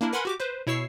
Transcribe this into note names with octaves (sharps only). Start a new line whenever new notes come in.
A#3 D4 E4 A#4
A#4 B4 F#5 G#5 B5 C6
F#4 G4 D6
B4 C5
B2 E4 C#5 C#6 E6 C7